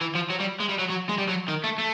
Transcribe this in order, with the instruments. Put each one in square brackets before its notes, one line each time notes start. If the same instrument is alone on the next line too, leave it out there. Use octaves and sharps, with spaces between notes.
[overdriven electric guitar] E3
F3
F#3
G3
G#3
G3
F#3
F#3
G#3
G3
F#3
D#3
A3
A3